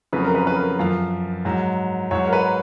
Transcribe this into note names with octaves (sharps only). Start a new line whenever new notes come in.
F2 C#3 F#3 B4
A#4
B4
B4
A#4
F#2 F3 F5
G#2 F#3
G#2 F#3 C#5
A#4
B4